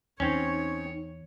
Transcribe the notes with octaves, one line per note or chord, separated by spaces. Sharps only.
E2 C4 C#4 D#4 C#5